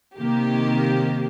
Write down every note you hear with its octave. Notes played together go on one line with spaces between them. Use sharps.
C3 D#3 A#3 G4